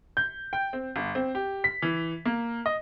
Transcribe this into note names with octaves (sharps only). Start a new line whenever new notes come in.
G6
G5
C4
G1
C4
G4
B6
E3
A#3
D#5